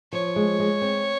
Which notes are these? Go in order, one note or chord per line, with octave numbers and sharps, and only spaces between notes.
F3 C#5
G#3
G#3
C4